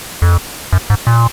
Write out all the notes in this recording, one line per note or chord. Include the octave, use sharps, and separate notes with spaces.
F2
F#2
G#2
A#2